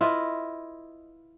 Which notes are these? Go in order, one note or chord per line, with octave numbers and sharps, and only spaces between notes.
E4 F4 B4 D#5